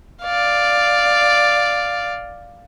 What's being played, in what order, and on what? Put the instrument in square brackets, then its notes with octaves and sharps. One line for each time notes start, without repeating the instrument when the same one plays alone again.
[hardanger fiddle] D5 F5